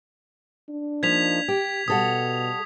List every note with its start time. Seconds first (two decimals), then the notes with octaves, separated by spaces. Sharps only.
0.69 D4
1.03 F3 A#3 D#4 G#6 B6 F7
1.48 G4
1.88 B2 G3 A4 F#5 D#6